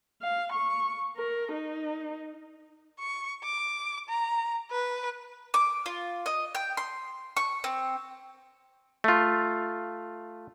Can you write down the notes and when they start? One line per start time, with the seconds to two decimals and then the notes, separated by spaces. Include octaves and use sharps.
0.22 F5
0.52 C#6
1.17 A#4
1.52 D#4
2.99 C#6
3.44 D6
4.09 A#5
4.71 B4
5.54 D6
5.86 F4
6.26 D#5
6.55 G5
6.77 C6
7.37 C#6
7.64 C4
9.04 A3 F4